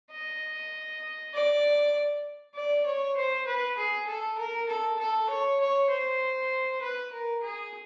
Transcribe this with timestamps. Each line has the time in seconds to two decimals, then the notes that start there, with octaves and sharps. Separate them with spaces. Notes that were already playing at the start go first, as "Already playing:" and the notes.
0.11 D#5
1.34 D5
2.55 D5
2.86 C#5
3.16 C5
3.47 B4
3.77 G#4
4.07 A4
4.38 A#4
4.68 A4
4.99 A4
5.29 C#5
5.60 C#5
5.90 C5
6.81 B4
7.12 A#4
7.42 G#4